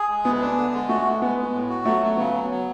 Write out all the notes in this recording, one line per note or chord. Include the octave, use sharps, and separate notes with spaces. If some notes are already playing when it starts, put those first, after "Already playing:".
Already playing: G#4
G#3
D2 B3
D4
D3
G#3
A3 F#4
G#3
G#3 B3
G#3
A2
F#4
F#3 A3
F#3
C#3 B3
F#3
F#3